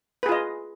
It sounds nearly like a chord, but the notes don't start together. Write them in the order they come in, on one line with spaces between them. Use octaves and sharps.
B4 G#4 F4 D#5